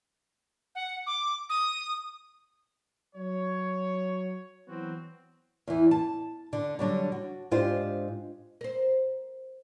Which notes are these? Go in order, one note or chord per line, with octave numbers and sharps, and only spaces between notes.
F#5
D6
D#6
F#3 C#5
E3 F#3 B3 C4 F#4
E2 E3
A5
D3 D4
D3 F#3 G3
F#4
G#2 D4 F4 G4 C5
A#4 C5